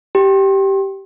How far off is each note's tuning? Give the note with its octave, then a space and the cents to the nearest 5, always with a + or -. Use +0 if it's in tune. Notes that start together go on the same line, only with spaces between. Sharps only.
G4 -10